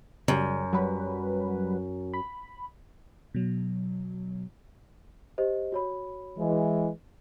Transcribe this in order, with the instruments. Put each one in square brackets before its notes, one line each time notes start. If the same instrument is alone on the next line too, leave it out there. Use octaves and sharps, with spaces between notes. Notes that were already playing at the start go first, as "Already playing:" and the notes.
[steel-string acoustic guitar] F#2 [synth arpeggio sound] C#3 G3
[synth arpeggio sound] F#3 G3 B4
B5
[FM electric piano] B2 F#3
[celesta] G4 C5 D#5
F#4 C#5 B5
[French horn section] E3 G#3